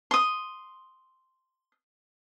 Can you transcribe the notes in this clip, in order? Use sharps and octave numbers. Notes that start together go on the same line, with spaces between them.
C6 D#6